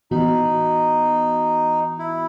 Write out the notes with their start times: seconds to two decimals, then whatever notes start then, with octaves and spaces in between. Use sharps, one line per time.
0.11 A2 E3 B3 D#4 F#4
1.99 E4